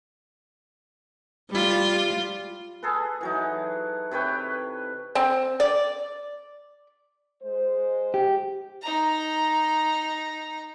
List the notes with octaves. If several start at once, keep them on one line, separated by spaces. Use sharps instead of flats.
G3 F4
G#4 A4 B4
E3 F#3 D#4
C3 B4 C#5 G5
C4
D5
G#3 C5
G4
D#4 A#5